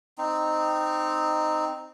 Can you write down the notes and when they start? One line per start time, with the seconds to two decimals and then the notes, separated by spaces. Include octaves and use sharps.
0.18 C4 D#4